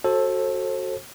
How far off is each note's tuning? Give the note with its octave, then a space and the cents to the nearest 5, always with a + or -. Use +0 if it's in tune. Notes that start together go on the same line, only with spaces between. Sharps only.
F#4 +0 A4 +0 C5 +35